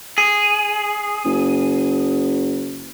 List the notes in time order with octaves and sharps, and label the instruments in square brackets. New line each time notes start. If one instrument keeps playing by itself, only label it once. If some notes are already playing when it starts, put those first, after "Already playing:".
[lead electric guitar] G#4
[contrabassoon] F#1